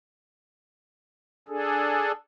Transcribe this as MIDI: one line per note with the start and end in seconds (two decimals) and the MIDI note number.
1.48 2.12 62
1.48 2.12 68
1.48 2.12 69